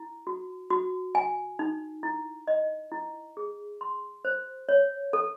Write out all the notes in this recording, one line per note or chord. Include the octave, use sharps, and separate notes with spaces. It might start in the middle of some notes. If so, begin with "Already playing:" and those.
Already playing: E4
F#4
F#4
G#5
D#4
E4
D#5
E4
G#4
C6
C5
C#5
A4